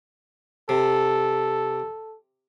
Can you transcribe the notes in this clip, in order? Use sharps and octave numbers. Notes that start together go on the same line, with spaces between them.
C3 A4